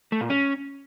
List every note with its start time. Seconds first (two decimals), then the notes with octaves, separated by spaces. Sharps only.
0.12 A3
0.21 A#2
0.30 C#4